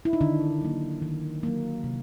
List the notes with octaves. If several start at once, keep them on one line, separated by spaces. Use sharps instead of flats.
E4
D#4
D3 D#3 D4
F#3 A#3
D#3
F#3 A#3
C3